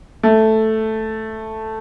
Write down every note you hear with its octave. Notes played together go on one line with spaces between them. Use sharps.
A3